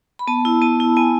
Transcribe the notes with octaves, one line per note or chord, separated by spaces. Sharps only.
B5
B3 A5
E4
B3 A5
E4
B3 G#5